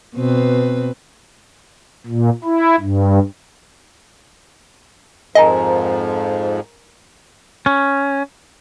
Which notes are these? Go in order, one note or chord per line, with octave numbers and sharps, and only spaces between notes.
B2 C4 B4
A#2
E4
G2
F2 G#2 F3 A#4 D#5 G#5 A#5
C#4